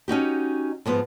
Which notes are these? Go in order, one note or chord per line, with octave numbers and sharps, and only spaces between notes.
C#4 D#4 F#4 G4
G#2 F3 B3